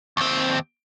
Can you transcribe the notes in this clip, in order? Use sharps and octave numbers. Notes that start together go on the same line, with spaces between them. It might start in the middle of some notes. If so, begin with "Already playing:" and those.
D#2 C4